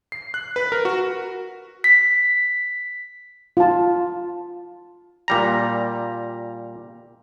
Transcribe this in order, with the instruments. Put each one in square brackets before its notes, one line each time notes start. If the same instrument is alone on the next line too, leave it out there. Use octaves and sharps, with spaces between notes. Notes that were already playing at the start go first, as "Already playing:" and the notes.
[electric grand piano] C7
F#6
B4
A#4
F#4
[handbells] B6
[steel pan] F4 A5
[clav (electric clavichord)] A#2 G3 A#5